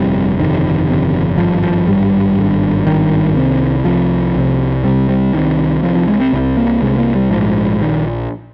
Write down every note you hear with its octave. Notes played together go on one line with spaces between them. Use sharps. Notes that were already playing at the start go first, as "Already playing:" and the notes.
Already playing: G1 F2 C3 G3
G1 F2 C3 D#3
G1 F2 C3
G#1 G2 F3
F3
G#1 G2 G3
G#1 G2
G#1 G2 D#3
C2 C3
C2 C3 F3
C2 C3
C2 C3 G3
G3
C2 C3 D#3
C2 C3 F3
F3
G#3
C4
C2 C3
A#3
C2 C3 G#3
A#3
G3
A#1 G#2 F3
A#1 D#3